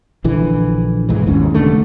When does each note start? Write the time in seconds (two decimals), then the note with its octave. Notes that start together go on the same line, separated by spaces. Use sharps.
0.24 A#1 D3 E3
1.09 B1 G#2 E3
1.27 G#1 D#2 G#2 C#4
1.54 F1 D#2 D3 A3